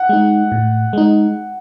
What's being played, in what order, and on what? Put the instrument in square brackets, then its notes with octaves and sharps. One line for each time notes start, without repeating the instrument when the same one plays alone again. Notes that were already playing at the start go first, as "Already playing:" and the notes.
Already playing: [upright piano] F#5
[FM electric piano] G#3 D#4
A2
G#3 D#4